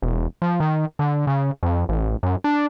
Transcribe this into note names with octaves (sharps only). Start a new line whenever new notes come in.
E1
F3
D#3
D3
C#3
F2
A1
F#2
D4